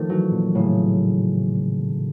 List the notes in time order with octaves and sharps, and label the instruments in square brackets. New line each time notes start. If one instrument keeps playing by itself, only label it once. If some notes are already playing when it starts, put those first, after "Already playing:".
Already playing: [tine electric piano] D#3 F3 [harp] A3
[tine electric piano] E3 [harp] F#3
[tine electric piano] A#2
[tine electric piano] A2 [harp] C#3